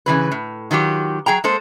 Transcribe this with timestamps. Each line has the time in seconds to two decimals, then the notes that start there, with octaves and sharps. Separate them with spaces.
0.06 C#3 E3 F#3 B4
0.32 A2
0.71 D#3 F#3 F4 G4
1.26 F#3 G#4 G5 A#5
1.44 G#3 A#3 A4 C5